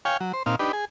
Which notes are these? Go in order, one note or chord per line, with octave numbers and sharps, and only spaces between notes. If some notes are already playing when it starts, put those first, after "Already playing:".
C#5 F5 G5 G#5
F#3
C5
A#2 C4 D#4 F5
D4 D#4 G4 B4
G#4